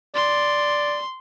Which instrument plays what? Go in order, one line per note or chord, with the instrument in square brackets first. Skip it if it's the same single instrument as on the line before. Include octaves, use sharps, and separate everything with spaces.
[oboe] D5 [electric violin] C6